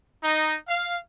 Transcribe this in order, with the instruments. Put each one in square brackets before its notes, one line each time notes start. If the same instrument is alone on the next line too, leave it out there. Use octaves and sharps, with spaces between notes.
[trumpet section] D#4
F5